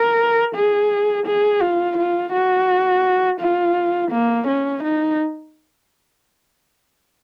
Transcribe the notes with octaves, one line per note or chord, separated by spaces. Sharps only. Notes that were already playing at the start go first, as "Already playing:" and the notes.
Already playing: A#4
G#4
G#4
F4
F4
F#4
F4
A#3
C#4
D#4